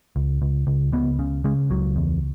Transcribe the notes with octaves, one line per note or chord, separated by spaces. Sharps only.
C#2
C#2
C#2
C#2 B3
C#3
C#3 G#3
C#2 F#3
E2